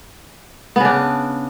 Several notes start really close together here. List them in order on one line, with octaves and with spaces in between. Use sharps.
B3 C#3 D4